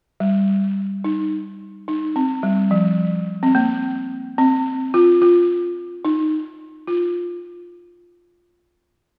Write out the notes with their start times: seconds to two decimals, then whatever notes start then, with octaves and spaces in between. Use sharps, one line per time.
0.20 G3
1.04 D#4
1.88 D#4
2.16 C4
2.43 G3
2.71 F3
3.43 C4
3.55 A#3
4.38 C4
4.94 F4
5.22 F4
6.05 D#4
6.88 F4